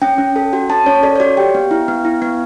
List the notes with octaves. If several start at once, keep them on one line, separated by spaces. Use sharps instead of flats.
C#4 G5
C#4
A4
F#4
C#4 A5
C#4 C#5
A4 D5
C#5
F#4 D5
G4 G5
B3
E4
B3
E4
B3